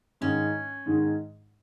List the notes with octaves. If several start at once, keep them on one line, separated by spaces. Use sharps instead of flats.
G#2 D#3 G#3 C#4 D#4
G#2 D#3 G#3 D#4